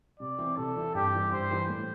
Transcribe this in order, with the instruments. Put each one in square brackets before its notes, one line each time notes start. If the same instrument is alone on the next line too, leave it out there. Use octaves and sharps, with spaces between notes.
[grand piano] C3 [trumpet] D5
[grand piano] E3 C4 E4
[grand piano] C3 [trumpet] A4
[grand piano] E3 C4 E4
[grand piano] G2 [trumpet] G4
[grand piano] E3 G3
[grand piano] G2 [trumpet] C5
[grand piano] E3 G3
A2